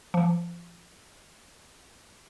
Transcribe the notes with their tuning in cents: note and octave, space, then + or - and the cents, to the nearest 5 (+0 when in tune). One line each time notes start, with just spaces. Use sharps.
F3 -25